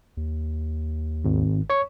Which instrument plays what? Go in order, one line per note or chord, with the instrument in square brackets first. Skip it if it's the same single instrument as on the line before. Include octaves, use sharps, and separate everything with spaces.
[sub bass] D#2
[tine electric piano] G#1
C#5 C#6